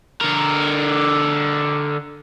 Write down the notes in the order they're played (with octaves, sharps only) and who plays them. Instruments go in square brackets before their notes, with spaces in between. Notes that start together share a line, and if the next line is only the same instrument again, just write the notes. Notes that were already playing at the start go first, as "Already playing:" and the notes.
[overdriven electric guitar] D3 A#4